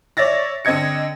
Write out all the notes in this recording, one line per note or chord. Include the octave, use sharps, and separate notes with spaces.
C#5 D5 E5 A6 A#6
D3 C4 D#5 G#6 C#7